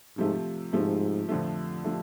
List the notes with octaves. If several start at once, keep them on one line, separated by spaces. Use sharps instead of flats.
G#2 C3 F3 A3
G#2 C3 F3 A3
F2 D3 F3 A3
F3 A3